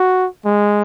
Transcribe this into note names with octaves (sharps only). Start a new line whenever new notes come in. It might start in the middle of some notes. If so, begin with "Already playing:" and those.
Already playing: F#4
G#3